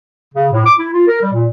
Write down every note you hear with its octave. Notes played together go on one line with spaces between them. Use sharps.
C#3
A2
D6
E4
F4
A#4
G3
A#2